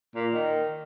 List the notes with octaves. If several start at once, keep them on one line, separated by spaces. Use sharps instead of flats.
A#2
D#3